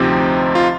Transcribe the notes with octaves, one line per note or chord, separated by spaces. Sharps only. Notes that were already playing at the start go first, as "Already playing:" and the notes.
Already playing: D2 C3 F3 C4 D#4 G4
F4